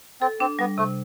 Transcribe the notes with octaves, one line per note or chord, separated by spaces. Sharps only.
C4 A4
C4 D4
G3 B3
C3 A3